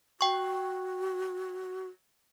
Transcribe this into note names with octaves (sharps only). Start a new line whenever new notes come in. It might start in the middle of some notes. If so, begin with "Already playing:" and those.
F#4 G5 C#6